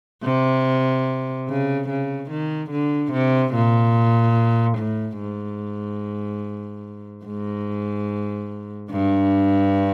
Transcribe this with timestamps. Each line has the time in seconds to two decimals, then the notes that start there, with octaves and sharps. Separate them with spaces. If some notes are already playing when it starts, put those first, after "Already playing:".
0.24 C3
1.48 C#3
1.89 C#3
2.31 D#3
2.71 D3
3.13 C3
3.55 A#2
4.78 A2
5.20 G#2
7.25 G#2
8.91 G2